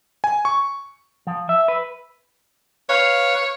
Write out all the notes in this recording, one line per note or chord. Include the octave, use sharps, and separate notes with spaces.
G#5
C#6
F3
E5
B4
B4 C#5 F5